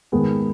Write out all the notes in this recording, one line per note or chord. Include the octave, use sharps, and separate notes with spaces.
G#2 D#3 B3 G#4